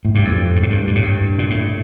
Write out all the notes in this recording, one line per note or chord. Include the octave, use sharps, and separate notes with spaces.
A2
G2
F2
G2
A2
G2
G2
A2
G2
A#2
A2